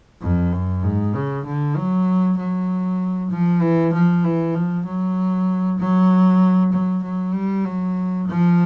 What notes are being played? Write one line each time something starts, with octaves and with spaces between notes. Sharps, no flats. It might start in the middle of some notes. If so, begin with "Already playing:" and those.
F2
F#2
G#2
C#3
D3
F#3
F#3
F3
E3
F3
E3
F3
F#3
F#3
F#3
F#3
G3
F#3
F3